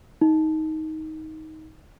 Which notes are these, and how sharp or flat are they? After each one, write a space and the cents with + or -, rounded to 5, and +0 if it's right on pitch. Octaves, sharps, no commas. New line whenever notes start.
D#4 +15